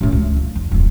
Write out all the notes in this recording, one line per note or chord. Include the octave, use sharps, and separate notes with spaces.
F#2 A2
C#2
E4
F3
E2
D1 F2